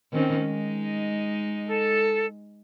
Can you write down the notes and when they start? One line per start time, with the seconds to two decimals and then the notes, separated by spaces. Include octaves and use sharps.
0.13 D#3 C4 C#4
0.42 G#3 D#4
1.67 A4